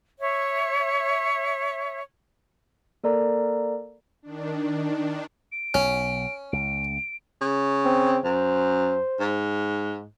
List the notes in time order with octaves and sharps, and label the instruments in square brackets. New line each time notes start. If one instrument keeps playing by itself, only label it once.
[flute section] C#5 E5
[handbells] A#3 A4 A#4 D5 A#5
[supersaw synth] D#3 D4
[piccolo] D7
[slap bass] B1 [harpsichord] C#4
[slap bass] C#2 [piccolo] D7
[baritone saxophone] C#3
[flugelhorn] C4
[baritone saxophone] F#2 [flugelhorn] C5
[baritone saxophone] G#2